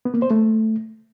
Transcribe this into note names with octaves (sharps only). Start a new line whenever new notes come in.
B3
A#3
C5
A3